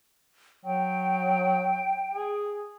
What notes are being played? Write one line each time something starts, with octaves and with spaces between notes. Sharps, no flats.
F#3 G5
G#4